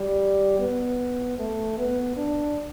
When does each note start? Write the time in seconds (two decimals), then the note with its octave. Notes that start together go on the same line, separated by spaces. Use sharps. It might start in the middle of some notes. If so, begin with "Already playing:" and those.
Already playing: G3
0.59 B3
1.39 A3
1.78 B3
2.16 D4